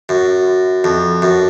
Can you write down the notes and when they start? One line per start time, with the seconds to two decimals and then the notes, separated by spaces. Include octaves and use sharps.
0.09 F#2
0.84 F2
1.22 F#2